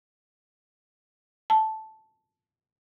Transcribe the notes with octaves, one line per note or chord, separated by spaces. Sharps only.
A5